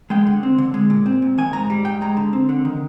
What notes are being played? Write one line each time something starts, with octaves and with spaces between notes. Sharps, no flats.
G#3 G5
D3
C4
D3
G#3
A#2
C4
A#2
D#3 G#5
G#2 A#5
G3
G#2 G5
G#3 A#5
D3
C4
D3
D#3